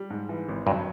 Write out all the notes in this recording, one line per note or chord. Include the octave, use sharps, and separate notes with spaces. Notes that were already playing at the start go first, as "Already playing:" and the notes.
Already playing: G3
G#2
E3
G#1
G2 F#3